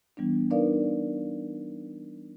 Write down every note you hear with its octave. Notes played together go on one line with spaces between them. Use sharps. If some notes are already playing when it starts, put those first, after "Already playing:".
E3 G3 B3 D4
D4 D#4 A#4 B4 D5 F5